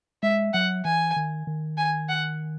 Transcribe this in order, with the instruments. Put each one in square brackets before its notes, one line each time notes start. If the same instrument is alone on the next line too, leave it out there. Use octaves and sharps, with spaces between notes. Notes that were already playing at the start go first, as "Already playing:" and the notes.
[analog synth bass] G#3 [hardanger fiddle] E5
[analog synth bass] F#3 [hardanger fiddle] F#5
[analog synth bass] E3 [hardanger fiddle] G#5
[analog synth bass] D#3
D#3
[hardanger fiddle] G#5
F#5